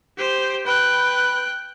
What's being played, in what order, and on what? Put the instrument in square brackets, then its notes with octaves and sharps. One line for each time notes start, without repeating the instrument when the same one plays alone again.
[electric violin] G4 C5
[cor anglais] B4 [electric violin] G5 F#6